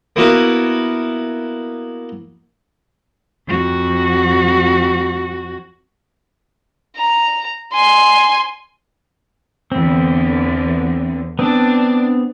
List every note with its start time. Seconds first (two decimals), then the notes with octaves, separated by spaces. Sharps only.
0.16 A#3 B3 E4 F#4 A#4 B4
3.47 F2 F#4
6.96 A#5
7.73 G#5 C6
9.72 E2 D3 C4
11.39 B3 C4 D4